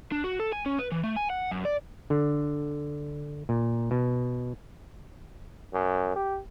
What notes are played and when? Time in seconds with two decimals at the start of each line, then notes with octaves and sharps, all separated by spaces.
0.12 D4
0.24 F#4
0.40 A4
0.52 G#5
0.66 C#4
0.79 B4
0.92 E3
1.04 A3
1.16 G#5
1.30 F#5
1.51 F#2
1.65 D5
2.10 D3
3.49 A#2
3.91 B2
5.73 F#2
6.16 G4